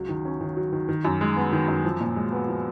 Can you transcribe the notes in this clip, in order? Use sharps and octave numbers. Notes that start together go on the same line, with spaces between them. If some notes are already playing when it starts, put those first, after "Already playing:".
Already playing: C#2 F#3
D#3
C#4
D#3
F#3
D#3
D#3
F#2
G#3
B3
D#3
F#2
F3
A#2
G#3
B3
F3